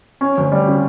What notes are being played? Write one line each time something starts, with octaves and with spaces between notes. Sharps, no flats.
C#4
D2
G3
C#3